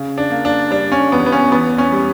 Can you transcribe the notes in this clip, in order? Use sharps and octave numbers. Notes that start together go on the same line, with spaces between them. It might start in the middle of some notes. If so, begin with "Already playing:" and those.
Already playing: C#3
D4
A#3
D4
G3 D4
C#4
E2 B3
B3
C#4
E2 B3
C#4
G3